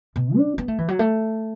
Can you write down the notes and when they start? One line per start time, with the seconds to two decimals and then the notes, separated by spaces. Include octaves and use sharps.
0.16 B2
0.37 D4
0.58 B3
0.68 A3
0.78 E3
0.88 F#3
0.99 A3